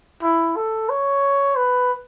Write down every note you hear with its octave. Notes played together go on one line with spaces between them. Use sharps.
E4
A4
C#5
B4